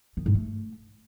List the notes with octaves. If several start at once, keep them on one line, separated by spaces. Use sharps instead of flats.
D#3
G#2
A3